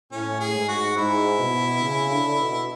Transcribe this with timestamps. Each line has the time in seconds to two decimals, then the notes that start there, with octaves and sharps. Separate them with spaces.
0.12 A2 C#4
0.40 G#4
0.54 G#2
0.69 F#4
0.96 G#2 E4
1.40 B2
1.82 C#3
2.11 D3
2.39 B2